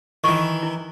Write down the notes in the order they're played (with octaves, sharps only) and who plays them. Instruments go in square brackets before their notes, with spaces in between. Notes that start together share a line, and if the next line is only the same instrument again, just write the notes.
[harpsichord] D#3 E3 [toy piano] C#6
[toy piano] E4